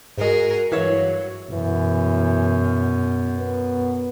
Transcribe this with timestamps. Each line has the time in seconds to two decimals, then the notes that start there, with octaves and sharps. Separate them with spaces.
0.18 G#2 G#3 F#4 G#4 A#4
0.72 G2 E3 F#3 C#5 E5 F5
1.52 F#2 B2 E3
3.39 B3